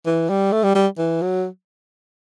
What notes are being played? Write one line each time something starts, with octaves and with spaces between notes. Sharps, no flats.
E3
G3
A3
G3
G3
E3
F#3